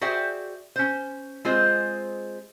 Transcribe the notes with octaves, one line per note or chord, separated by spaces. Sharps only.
F#4 G#4 C5 D5 E5 G5
C#4 C5
G#3 C4 F4 G#4 C5 D#5